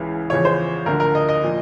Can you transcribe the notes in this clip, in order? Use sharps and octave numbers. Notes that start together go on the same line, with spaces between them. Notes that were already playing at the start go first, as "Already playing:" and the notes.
Already playing: C#2 C#3 E3
E2 C#3 F3 C#5
C5
D2 D3 F3 A#4
A#4
D#5
D#5
A#2 F3